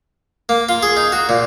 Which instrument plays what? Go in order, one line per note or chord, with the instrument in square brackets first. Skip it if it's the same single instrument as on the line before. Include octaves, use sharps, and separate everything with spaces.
[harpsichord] A#3
F4
G#4
D#4
F#4
A#2